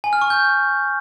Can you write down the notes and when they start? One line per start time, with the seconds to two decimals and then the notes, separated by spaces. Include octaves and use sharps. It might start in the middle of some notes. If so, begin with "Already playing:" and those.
0.04 G#5
0.13 F6
0.22 C#6
0.30 G6